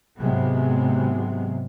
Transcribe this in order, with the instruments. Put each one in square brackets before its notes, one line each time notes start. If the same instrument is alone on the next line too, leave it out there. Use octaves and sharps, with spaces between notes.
[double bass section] G#1 G#2 C3 F#3 G#3 B3